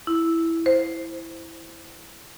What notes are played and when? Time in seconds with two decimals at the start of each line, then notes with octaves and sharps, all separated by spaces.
0.07 E4
0.66 C5